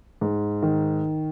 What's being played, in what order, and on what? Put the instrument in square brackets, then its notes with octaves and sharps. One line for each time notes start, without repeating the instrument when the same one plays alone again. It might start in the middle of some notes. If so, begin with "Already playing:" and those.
[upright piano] G#2
D#3